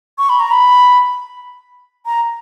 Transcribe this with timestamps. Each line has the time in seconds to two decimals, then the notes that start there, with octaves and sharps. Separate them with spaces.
0.19 C#6
0.29 B5
0.40 A#5
0.51 B5
2.06 A#5